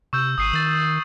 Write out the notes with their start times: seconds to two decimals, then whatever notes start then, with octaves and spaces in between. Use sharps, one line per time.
0.13 C3 C#6 E6 G6
0.38 G#1 D#6 C7 D#7
0.53 D#3 A6 F#7